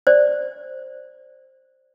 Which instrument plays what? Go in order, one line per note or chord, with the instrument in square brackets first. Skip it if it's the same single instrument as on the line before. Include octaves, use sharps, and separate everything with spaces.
[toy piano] C5 D5